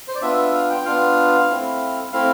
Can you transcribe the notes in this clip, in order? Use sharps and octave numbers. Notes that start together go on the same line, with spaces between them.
C5
D5
B3 D4 F4 E5
E5
F5
G5
B3 D4 F4 F5
A3 C4 E4
A3 C4 E4 F5